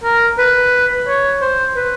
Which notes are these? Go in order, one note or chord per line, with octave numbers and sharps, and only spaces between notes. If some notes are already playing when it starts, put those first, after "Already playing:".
A#4
B4
C#5
C5
B4